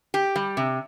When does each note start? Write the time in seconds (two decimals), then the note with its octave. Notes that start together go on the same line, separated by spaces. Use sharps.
0.14 G4
0.36 G3
0.57 C3